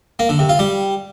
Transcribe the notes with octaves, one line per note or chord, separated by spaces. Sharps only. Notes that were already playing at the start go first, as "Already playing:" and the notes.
A#3
D3
C3
F4
G3